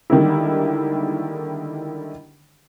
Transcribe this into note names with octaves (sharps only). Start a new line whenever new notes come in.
D3 D#3 G3 G#3 A#3 E4